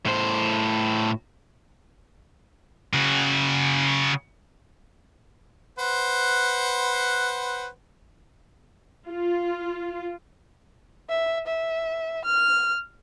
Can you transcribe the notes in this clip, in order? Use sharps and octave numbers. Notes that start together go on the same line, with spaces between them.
A2 C5
C#3 F#4
B4 C5 F#5
F4
E5
E5
F6